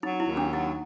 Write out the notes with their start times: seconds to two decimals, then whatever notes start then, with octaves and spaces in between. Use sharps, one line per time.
0.03 F#3 D#4
0.20 E4
0.28 D#2
0.37 D4
0.53 F#3 D#4